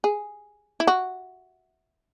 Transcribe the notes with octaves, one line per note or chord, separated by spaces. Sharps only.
G#4
E4
F#4